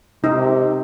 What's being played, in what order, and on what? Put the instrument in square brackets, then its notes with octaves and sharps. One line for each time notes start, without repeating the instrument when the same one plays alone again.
[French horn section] C3 [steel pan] D#4